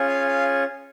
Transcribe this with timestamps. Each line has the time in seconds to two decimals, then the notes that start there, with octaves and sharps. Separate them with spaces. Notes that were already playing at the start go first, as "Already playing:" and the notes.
Already playing: C#4 F4 G#4
0.08 F5
0.28 F5